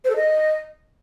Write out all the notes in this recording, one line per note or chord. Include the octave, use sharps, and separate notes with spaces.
C5
A4
D#5